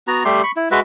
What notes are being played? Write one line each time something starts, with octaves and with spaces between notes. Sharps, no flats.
B3 F#4 A#5
G3 A3 G4 C6
B5 C#6
E4
G#3 F#4 B4 E5